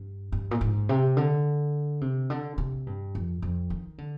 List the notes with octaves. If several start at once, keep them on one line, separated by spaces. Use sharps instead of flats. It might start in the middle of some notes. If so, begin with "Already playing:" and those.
Already playing: G2
G2
A#2
G#2
C3
D3
C3
D3
C3
G2
F2
F2
D#3
D3